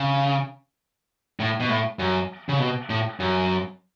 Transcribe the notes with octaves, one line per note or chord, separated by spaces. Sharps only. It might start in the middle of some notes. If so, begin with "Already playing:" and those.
Already playing: C#3
A2
B2
A2
F#2
C#3
B2
A2
F#2